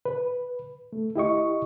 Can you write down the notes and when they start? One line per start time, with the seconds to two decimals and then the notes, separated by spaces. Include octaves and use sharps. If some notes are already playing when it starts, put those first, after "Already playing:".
0.05 B4
0.93 A3
1.16 E4 G4 D#5 C#6